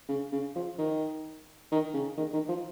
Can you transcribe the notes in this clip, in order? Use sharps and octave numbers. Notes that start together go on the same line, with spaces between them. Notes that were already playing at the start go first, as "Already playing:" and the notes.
C#3
C#3
F3
D#3
D#3
C#3
D#3
D#3
F3